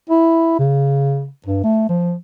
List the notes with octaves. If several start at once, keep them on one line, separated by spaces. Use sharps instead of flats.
E4
C#3
G2
A3
F3